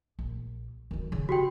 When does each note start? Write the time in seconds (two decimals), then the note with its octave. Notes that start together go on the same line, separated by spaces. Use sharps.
0.19 A#1
0.91 D2 D#3
1.12 C#3 C#4
1.29 F#4 G4 G5